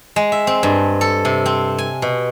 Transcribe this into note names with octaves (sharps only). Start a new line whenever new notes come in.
G#3
E5
C4
G2
A4
C3
C4
G#5
B2